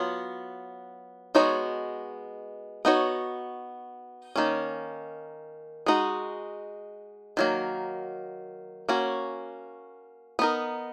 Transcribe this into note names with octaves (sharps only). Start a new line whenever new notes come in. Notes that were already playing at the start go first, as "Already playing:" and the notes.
Already playing: F#3 B3 F4
G#3 B3 D#4 F#4 C#5
B3 D#4 F#4 C#5
D#3 A#3 C#4
G#3 D#4 F#4
D#3 F#3 A#3
A#3 C#4 F#4
B3 D#4 A#4